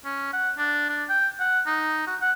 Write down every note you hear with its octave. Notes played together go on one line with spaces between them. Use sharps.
C#4
F#5
D4
D4
G5
F#5
D#4
F#4
F#5